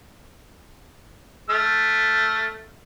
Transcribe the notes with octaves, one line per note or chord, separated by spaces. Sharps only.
A3 F6